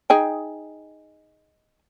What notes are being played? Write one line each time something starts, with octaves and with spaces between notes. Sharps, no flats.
D#4 G#4 G5